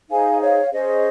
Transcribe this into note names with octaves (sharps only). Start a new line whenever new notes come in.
D#4 G#4 C5 F5 G#5
C#5 F5
C#4 G#4 C5 D#5